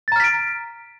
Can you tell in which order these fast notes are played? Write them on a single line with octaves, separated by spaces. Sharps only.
A6 A#5 F6 B6 D7